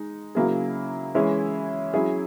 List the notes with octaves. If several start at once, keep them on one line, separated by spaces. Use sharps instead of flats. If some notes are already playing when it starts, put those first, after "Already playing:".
Already playing: G#3 D#4
C#3 F#3 A#3 E4 G#4
E3 G#3 C#4 E4 G#4
F#3 C#4 E4 G#4